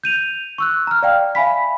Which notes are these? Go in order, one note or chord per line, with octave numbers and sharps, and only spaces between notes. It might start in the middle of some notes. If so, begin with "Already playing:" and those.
G6 D#7 F7
C#6 E6 F#6
A#5 F6
D5 F5 G5
E5 F5 G#5 B5 B6